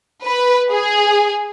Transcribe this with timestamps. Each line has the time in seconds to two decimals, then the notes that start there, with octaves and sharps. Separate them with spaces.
0.24 B4
0.72 G#4